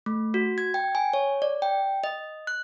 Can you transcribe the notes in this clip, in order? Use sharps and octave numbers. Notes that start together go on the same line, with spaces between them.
A3
F#4
G#6
G5
G#5
C#5
D5
G5
D#5
F#6